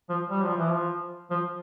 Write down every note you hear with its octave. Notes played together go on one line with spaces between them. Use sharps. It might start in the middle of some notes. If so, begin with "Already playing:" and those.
F3
G3
F3
E3
F3
F3